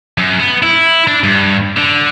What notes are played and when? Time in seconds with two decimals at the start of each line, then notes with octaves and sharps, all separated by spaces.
0.18 F#2
0.40 B3
0.63 E4
1.07 D4
1.24 G2
1.77 D3